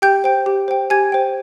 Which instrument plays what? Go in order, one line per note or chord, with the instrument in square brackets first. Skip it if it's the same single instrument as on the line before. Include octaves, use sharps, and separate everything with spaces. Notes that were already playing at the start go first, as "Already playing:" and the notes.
[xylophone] G4 G5 G6
C5 G5
G4
C5 G5
G4 G#5 G#6
C5 G5